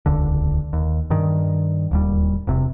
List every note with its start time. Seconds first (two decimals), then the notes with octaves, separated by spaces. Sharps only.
0.06 D#1 C#2 D3
0.73 D#2
1.10 G2 D#3
1.91 D1 D#2 G3
2.47 E1 C3